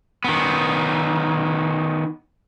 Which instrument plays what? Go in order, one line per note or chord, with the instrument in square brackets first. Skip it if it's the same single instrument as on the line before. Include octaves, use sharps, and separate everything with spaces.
[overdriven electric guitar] D#3 B3